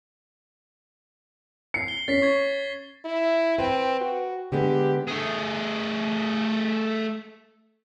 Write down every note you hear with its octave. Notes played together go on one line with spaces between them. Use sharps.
C7 C#7
G7
C#4 A6 B6 C7
C#6 G#6
E4
C4 B4 G5
F#4
D3 G#3 B3 G4
A3 G#4